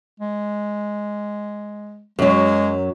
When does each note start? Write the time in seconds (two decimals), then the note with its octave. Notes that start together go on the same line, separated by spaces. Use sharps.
0.20 G#3
2.19 F#2 F#3 G#3